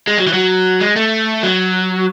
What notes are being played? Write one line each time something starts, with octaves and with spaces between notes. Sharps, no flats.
G#3
F#3
E3
F#3
G#3
A3
F#3